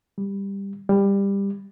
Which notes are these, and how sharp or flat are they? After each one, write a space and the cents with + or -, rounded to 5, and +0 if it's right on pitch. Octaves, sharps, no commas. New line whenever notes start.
G3 +15
G3 +20